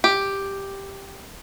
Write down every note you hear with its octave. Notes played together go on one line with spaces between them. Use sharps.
G4